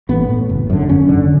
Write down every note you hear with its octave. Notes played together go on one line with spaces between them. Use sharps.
A1 B3
A2
F#1
F#2 D3
F#1 C#4
F#2 D3